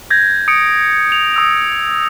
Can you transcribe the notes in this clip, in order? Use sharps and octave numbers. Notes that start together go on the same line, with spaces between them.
G6 G#6 A#6
D#6 C#7 D7
F7
D#6 E6 F7